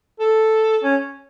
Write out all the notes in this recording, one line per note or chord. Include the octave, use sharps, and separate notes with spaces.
A4
C#4